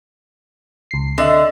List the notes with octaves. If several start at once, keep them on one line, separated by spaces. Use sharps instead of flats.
C#2 C7
D3 D#5 E5